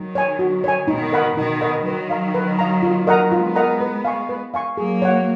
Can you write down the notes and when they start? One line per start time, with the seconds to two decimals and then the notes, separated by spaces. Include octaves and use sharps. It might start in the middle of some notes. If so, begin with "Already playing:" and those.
Already playing: D#3 F#3
0.15 C#5 G#5
0.39 F#4
0.64 C#5 G#5
0.88 B2 D#3 D#4
1.12 A#4 D#5 F#5 B5
1.36 B2 D#3 D#4
1.61 A#4 D#5 F#5 B5
1.85 D#3 F#3 B4
2.10 F5 A#5
2.34 B4
2.59 F5 A#5
2.83 F4
3.07 A#4 D#5 F#5 A#5
3.31 G#3 B3 F4
3.56 A#4 D#5 F#5 A#5
3.81 B4
4.05 F5 G#5 C#6
4.29 B4
4.54 F5 G#5 C#6
4.77 F#3 A#3 G#4
5.02 C#5 F#5